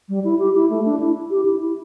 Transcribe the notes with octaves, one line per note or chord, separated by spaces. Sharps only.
G3
E4
G4
E4
A3
D4
E4
G4
E4
E4